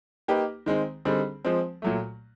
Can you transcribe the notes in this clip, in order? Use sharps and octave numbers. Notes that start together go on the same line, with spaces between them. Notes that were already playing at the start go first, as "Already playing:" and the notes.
A#3 D#4 G4 B4
D#3 G#3 C4
D3 G3 C4 D#4 G#4
F3 G#3 C4
A#2 F#3 A3